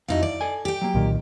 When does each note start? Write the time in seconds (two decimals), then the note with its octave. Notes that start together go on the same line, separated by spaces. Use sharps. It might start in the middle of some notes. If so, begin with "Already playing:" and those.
0.08 F2 D#4 E4 F#4 F5
0.23 D5
0.41 A4 G#5
0.65 G4 G5
0.81 F#3 A#3
0.94 C2 A#2 D#3